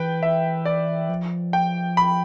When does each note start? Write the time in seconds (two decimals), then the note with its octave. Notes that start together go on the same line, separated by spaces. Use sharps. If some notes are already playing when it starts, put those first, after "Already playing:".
Already playing: E3 B4 G5
0.23 E5
0.65 D5
1.09 F3
1.53 G5
1.97 B5